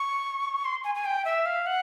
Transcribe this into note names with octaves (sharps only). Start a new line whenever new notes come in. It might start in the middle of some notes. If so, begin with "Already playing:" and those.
Already playing: C#6
C6
G#5
G#5
G5
E5
F5
F#5